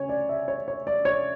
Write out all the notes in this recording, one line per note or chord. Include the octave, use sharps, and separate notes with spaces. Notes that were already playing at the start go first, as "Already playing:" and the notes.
Already playing: C#3 C#5 G#5
D5
E5
C#5
C#5
D5
C#5